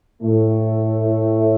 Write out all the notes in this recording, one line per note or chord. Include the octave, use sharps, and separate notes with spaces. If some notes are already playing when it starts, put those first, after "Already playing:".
A2 A3